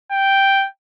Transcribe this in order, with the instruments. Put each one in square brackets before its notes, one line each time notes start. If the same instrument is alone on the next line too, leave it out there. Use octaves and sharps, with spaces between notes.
[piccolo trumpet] G5